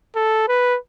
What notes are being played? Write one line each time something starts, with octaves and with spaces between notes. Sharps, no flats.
A4
B4